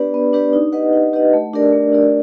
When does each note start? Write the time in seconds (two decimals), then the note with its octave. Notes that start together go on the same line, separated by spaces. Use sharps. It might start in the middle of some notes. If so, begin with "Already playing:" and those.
Already playing: B3 D4 G4 B4 D5
0.14 B3
0.33 D4 G4 B4 D5
0.53 D#4
0.73 G4 B4 D#5 F#5
0.93 D#4
1.13 G4 B4 D#5 F#5
1.33 A3
1.53 D4 G4 A#4 D5
1.72 A3
1.92 D4 G4 A#4 D5